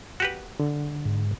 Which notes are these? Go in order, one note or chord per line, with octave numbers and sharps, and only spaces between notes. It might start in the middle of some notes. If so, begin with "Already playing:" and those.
F#4 G4 B4
D3
G#2